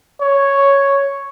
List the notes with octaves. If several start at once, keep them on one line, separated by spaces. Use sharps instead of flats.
C#5